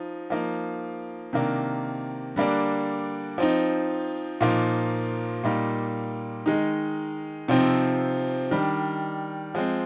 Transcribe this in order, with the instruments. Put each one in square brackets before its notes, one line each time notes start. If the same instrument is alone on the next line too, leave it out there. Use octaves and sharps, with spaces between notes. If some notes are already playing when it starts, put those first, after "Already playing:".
Already playing: [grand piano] F3 D#4
F3 A#3 D#4
C3 D#3 A#3 D4
D3 G3 A#3 D4
F3 C4 D#4
A#2 F3 A#3 D#4
A#2 G3 A#3 D#4
D#3 G#3 D#4
C3 F3 C4 D#4
D#3 G3 D4
F3 G#3 C4